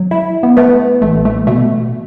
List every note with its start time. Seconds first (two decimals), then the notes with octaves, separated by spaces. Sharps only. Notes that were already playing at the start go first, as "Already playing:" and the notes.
Already playing: F#3
0.11 E4
0.43 B3
0.57 A3 B3
1.02 A1 A3
1.25 A3
1.47 B2 A3